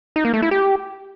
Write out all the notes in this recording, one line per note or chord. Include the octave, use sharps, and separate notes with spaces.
D#4
A#3
A3
E4
G4